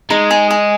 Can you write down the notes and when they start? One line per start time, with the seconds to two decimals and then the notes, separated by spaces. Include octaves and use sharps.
0.10 G#3 D#4
0.31 G#4
0.51 G#4